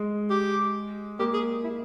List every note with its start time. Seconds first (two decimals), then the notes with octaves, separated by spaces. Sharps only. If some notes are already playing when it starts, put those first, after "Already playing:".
Already playing: G#3
0.30 G4
1.19 A#3 G4
1.33 G#4
1.64 E4